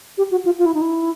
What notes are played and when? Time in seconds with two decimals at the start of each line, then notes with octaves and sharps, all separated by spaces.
0.18 G4
0.31 F#4
0.45 F4
0.59 F4
0.66 E4
0.74 D#4
0.82 E4